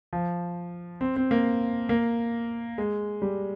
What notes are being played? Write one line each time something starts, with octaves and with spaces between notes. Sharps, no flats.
F3
C4
C4
A#3
A#3
G#3
G3